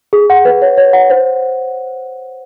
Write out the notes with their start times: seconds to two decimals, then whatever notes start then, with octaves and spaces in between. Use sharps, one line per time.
0.13 G#4
0.30 F#5
0.45 B4
0.62 C#5
0.77 C#5
0.93 F#5
1.10 C5